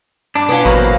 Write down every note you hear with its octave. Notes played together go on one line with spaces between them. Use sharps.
G2 D4
B3 C#4 F4
A1 E2 B2 F#3 A#3 B4 C5
F#2 F#4 F5